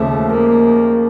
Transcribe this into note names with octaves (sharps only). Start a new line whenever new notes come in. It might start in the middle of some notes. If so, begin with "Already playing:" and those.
Already playing: D#2 C#3 F3 G#3 A3 C#4
A#3